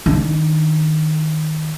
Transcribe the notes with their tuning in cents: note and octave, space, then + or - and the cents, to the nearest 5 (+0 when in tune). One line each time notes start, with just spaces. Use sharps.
D#3 +0 D4 +0